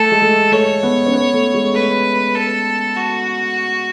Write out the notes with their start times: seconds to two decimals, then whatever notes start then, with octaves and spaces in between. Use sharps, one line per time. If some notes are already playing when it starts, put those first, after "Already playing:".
Already playing: A3 A4
0.12 G#3
0.22 A3
0.52 A3 C#5
0.83 B3
1.06 C#4
1.13 B3
1.34 A3
1.54 G#3
1.74 A3 B4
2.35 A4
2.96 F#4